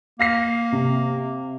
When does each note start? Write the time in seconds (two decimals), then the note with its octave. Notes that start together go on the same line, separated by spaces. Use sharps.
0.19 A#3 F5 A#6 C7
0.72 C3